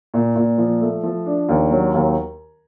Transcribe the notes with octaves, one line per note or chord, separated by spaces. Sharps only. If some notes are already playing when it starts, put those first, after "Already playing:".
A#2
A#2
F3
A3
F3
D4
D#2
F#3
D#2